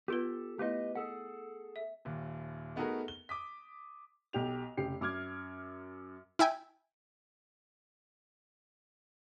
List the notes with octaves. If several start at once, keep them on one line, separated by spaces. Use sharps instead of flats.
B3 F4 G4 A4 B4
A3 B3 E4 G4 B4 D#5
G#4 A4 D#5 F#5
E5
D#1 D#2
A3 B3 D#4 F#4 G#4 A#4
G7
D6 D#6 B6
B1 G4 F7
F1 C#3 G4 C7
F#2 D6 F6 G#6
E4 E5 G5 G#5